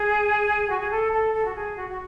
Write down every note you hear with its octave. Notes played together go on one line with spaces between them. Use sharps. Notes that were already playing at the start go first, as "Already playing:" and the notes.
Already playing: G#4
F#4
G#4
A4
A4
A4
F#4
G#4
F#4
F#4